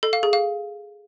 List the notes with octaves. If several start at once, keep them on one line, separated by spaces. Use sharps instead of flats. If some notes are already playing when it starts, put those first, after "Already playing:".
A4
F5
G#4
F5